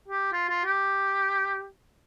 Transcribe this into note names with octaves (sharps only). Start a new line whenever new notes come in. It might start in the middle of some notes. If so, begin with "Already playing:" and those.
G4
F4
F4
G4